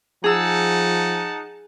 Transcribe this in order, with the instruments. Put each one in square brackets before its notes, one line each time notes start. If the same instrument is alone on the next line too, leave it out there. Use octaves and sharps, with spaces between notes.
[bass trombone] F3 [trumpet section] D#4 F#5 A5 [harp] G#4 E6